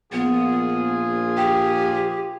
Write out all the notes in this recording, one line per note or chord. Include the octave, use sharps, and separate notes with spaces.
A#1 B3 F4 G#4
G4 G5